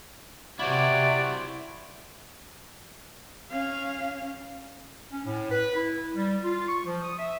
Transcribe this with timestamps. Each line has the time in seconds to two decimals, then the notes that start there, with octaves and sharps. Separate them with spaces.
0.60 C3 E4 F#4 C5 D5
3.51 C#4 F5
5.11 C#4
5.26 A2
5.51 B4
5.75 E4
6.14 G3
6.43 F4
6.68 C#6
6.85 F3
7.02 D#6
7.18 E5